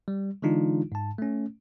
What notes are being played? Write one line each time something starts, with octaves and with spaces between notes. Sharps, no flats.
G3
D3 E3 G#3 D4 D#4 F4
G#2 A5
A3 C#4